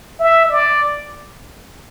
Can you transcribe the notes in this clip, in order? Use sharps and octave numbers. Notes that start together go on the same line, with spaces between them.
E5
D5